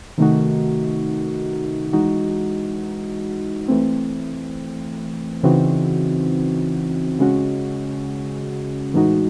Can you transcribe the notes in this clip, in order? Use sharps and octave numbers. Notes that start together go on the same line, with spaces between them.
C3 D#3 A3 D#4 F#4
E3 G#3 D#4 F#4
E3 A3 C4
C#3 E3 C4 D#4 F#4
C#3 G#3 C#4 F#4
A2 E3 G#3 D#4 F#4